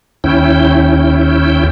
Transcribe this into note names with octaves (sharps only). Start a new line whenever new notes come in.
D#2 C#4 E4 G5